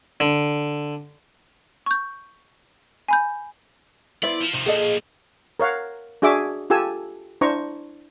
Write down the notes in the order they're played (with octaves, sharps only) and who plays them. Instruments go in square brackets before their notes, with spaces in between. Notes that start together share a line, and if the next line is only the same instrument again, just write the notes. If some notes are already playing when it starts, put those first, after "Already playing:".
[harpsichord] D3
[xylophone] C#6 G6
G#5 B5 G6
[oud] B3 E4 C5 [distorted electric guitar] D5
[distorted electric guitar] F3
[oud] C3 [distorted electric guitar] D#3 F3
[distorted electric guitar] A#2 F3 [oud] G#4 A4 D#5
[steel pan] A#4 C#5 F5 F#5
D4 F#4 G#4 E5 D6
F4 G4 A4 G#5 E6
D4 E4 C5 A#5 C#6